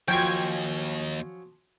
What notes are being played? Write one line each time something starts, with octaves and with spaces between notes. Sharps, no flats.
D#2 F3 F#3 C#4 G5 G#5 C6 G#6